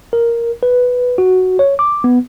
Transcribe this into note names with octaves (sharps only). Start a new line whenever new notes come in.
A#4
B4
F#4
C#5
D6
B3